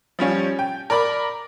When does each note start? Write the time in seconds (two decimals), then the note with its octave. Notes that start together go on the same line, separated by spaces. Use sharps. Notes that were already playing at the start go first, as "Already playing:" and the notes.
0.19 F3 G3 C#4 F4
0.59 G5
0.90 A#4 D5 B5 D6